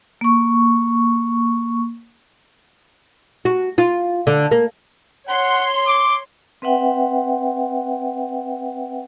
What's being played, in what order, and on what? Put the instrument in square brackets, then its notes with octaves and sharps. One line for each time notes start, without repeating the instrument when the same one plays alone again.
[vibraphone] A#3 C#6
[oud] F#4
F4
D3
A#3
[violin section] C#5 C6 [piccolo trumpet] F#5
[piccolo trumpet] D6
[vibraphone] C4 B4 E5 F#5 G5